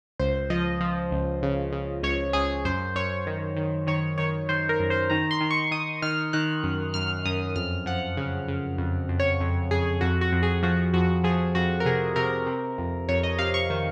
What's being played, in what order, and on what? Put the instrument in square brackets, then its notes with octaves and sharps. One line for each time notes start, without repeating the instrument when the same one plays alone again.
[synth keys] C#2 C5
F3 D#5
F3
C#2
C#3
C#3
C#2 C#5
C#2 G#4
F#2 C5
F#2 C#5
D#3
D#3
D#3 C#5
D#3 C#5
D#3 C5
A#4
F#2
C5
D#3 A#5
C6
D#3
C#6
D#3 D#6
D#3 F6
D#3 F#6
F#2
F#2 F6
F#2 D#6
F2 F6
F3 F#5
C#3
C#3
F2
F2
C#5
F2
F2 G#4
F2 F#4
F#4
F2
G#4
F3 F#4
F2 F#4
F3 G#4
F2 F#4
A#4
C3 G#4
C3 A#4
C3
F2
F2 C#5
D#5
C3 F5
C#6
D#3